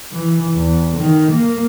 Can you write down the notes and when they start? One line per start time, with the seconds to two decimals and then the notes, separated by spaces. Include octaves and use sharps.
0.12 E3
0.55 E2
0.98 D#3
1.31 A#3